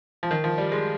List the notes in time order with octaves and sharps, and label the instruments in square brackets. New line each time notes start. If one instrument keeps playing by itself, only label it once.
[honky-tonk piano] F3
D#3
F3
G3
G#3